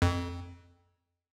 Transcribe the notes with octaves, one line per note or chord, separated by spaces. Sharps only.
F2